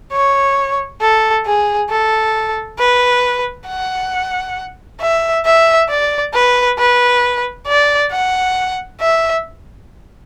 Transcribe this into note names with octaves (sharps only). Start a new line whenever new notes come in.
C#5
A4
G#4
A4
B4
F#5
E5
E5
D5
B4
B4
D5
F#5
E5